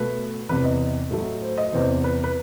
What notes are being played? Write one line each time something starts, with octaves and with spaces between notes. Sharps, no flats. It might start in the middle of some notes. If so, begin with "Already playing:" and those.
Already playing: B2 A3 B4
E2 C3 E3 B4
D#5
A2 F#3 A3
C5
D#5
E2 C3 E3 C5
B4
B4